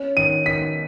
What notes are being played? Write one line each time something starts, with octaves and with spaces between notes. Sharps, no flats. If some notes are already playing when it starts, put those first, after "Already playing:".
Already playing: C#4
D#3 D#7
D#3 B6